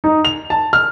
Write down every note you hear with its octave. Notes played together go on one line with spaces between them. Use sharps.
D#4
F7
A5
F6